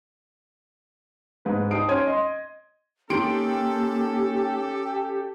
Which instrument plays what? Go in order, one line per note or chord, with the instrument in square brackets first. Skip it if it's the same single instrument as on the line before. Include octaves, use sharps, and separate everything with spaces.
[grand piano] G#2 B4
G3 D#4 A5 D#6 C7 D7
C#4 C#5 C6 F6 G#6 D#7
D#5 C6
[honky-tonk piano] D#3 C6 D7 [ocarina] A#3 [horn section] C#4 A4 [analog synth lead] G4